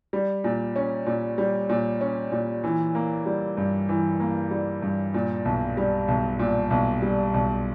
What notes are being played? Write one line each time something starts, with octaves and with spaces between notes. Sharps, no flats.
G3
A#2
C#4
A#2
G3
A#2
C#4
A#2
E3
A#3
G3
G2
E3
A#3
G3
G2
A#2
B1
G3
B1
A#2
B1
G3
B1